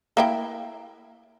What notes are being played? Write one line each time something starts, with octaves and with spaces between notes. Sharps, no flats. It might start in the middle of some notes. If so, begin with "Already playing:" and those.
A#3 E4 G5